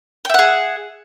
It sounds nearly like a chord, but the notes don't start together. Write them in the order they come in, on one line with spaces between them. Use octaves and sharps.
G5 E5 F#5 G#4